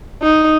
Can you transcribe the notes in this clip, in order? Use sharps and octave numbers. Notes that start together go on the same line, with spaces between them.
D#4